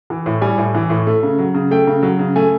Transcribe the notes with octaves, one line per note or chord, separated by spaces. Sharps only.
E3
A2
G3 G#5
A2
E3
A2
A3
C#3
F#3
C#3
A3 G5
C#3
F#3
C#3
A3 G#5